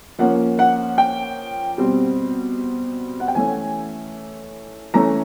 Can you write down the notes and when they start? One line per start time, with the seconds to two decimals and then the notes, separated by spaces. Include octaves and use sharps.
0.18 F3 A#3 C#4 F#5
0.59 F#5
0.98 G5
1.78 B2 G3 C4
3.20 F#5
3.28 G5
3.35 E3 A3 C#4 G#5
4.94 E3 A3 C#4 A#5